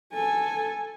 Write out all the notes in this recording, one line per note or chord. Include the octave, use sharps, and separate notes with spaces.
A4 G#5